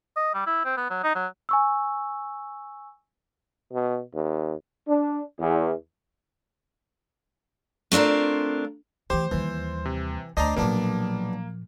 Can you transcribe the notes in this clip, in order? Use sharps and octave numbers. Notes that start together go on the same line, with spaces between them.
D#5
G3
E4
C4
B3
F#3
D#4
F#3
G#5 C#6 E6
B2
D#2
D4
E2
A3 C4 D4 F4 A#4
D2 E3 G4 C5
D#2 E3 G3
C3
D2 D4 C5 D5 D#5 A#5
B1 A#2 F3 A#3 B3 D4